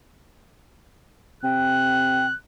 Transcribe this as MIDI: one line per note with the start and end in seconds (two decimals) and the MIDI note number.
1.43 2.30 48
1.43 2.26 79
1.43 2.36 90